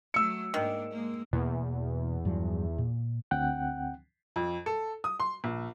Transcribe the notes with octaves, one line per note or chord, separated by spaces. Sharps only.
F#3 A3 E6 C#7
G#2 D#3 A#3 D4
G#3 A#3
E2 B2 A#3
G2 F3 F#3
A#2
D2 C4 F#5 G5 F#6
F2
A4
D#6
C6
A#1